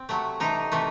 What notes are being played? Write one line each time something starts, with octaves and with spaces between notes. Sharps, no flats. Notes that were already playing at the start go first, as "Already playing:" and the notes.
Already playing: C4
C3 F#3 A3
C3 E3 A3 D#4
C3 E3 A3